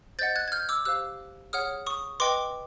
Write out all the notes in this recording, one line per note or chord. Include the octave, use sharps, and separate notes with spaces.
C5 D#5 F#5 G6 A6
F#6 G#6
G#6
F6 G6
D6 E6
G4 C5 F5 E6 F#6
G#4 C#5 F#5 D#6 F6
C#6 D#6
B4 D#5 G5 C6 D6